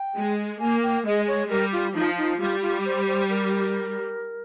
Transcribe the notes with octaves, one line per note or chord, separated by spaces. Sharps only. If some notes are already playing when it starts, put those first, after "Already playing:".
Already playing: G5
G#3
A#3 G#5
G5
G#3 D#5
C#5
G3 A#4
F4
F3 D#4
D#4
G3 F4
F4
C5
C5
A#4